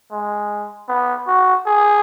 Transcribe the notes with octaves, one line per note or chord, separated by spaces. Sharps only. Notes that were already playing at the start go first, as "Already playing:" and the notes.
G#3
B3
F#4
G#4